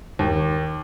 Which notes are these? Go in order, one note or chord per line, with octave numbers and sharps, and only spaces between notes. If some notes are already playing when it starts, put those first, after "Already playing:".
D#2